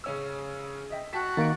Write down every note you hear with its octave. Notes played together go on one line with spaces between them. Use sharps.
C#3 C#4 E6
D#5 E5 G5
F#4 G5 A5 B6
D#3 A#3 A6 D7